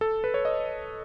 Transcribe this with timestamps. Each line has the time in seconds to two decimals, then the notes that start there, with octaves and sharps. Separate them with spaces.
0.01 A4
0.24 B4
0.34 C#5
0.45 D#5